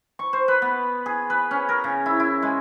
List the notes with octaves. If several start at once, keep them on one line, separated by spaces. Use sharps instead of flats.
C#6
C5
B4
B3
G#4
B4
C#4
A#4
C#3
E4
E4
G#3